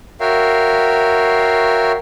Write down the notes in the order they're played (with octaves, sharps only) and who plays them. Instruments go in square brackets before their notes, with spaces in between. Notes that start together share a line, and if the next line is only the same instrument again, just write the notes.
[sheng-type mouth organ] F#4 A#4 C#5 E5 F5 G5